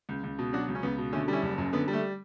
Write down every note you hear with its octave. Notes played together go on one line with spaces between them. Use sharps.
C#2
C#2
B2
F#3 D4 F#4
C#2
C#4
C#2 B3
B2
D3 A3 C#4
G3 C#4 E4
F#1
F#2
D3 B3
G3
A3